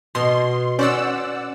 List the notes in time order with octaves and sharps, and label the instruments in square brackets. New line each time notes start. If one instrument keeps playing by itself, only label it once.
[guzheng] B2 [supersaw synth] C6
[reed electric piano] C#4 [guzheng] C5 [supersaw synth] D5 F#5 E6